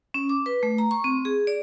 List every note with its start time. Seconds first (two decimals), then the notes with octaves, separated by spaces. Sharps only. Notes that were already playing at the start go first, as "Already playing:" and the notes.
0.14 C#4
0.29 D6
0.46 B4
0.63 A3
0.78 A#5
0.91 C#6
1.04 C4
1.25 G#4
1.47 D5